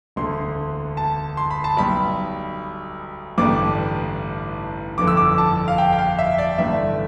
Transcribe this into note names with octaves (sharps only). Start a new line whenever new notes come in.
E1 D2 D3 C6
A5
C6
B5
A5
B1 B2 G3 B5
A1 G2 D3 G3 D4 D6
G1 F2 D3 F3 D6
E6
D6
A5
F5
G5
G5
F5
E5
D5
A1 G2 D3 A3 E5